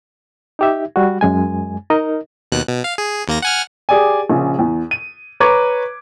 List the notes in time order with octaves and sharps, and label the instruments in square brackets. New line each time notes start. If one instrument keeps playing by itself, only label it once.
[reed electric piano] D#4 G4 E5
G3 F#4
F#2 G#3 G#5
D#4 A#4 D#5
[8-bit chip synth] D#2 B2 F#6
B2
F5
G#4
D#2 A#3 A#6
F#5 G#5 F6
[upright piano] G4 G#4 D5 G#5
A#1 C#3
E2
D#7
B4 C#5 A#5 C#6 D6 G#6